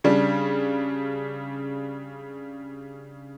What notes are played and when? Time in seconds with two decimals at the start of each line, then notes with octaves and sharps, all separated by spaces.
0.04 C#3 G3 D4